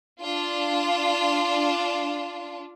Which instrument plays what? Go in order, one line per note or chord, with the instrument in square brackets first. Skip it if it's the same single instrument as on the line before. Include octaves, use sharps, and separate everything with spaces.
[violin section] D4 F4